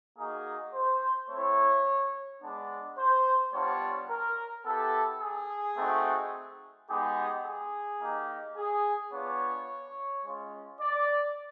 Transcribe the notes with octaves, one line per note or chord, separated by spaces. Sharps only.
A#3 D#4 F#4 G#4
C5
A3 C4 E4 C#5
G#3 B3 D4
C5
G3 B3 D4 F4 C#5
A#4
B3 E4 G4 A4
G#4
A3 C4 D#4 F#4
G#3 B3 D#4 G4 G#4
G#4
A#3 D#4 G4
G#4
B3 D4 F4 C#5
G#3 C#4 F4
D5